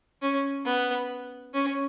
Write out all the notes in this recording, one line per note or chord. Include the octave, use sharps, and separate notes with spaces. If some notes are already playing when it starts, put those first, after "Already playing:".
C#4
B3
C#4